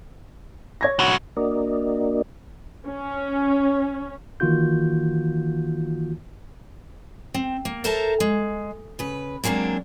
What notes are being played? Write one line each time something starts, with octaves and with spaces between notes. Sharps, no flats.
C#5 G#6 A#6
C2 F#4
A#3 D4 F#4 A#4 D5 D#5
C#4
D#3 E3 A#3 F4 F#4 G6
C4
A#3
A4 A#4 C5 E5 A5 A#5
G#3
C#3 B4
F#3 G#3 A#3 C4 D4